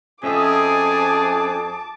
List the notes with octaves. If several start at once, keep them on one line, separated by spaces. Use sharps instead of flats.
F2 C#4 G#4 D#5 E5 A5 D6